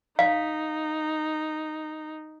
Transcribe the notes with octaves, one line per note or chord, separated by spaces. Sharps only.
D#4 F5